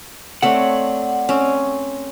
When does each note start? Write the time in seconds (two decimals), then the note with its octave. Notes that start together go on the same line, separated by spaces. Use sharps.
0.42 A3 C4 C#5 D5 F#5
1.29 C4 C#4